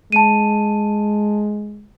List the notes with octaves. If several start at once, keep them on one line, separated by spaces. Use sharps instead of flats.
G#3 A5 D#7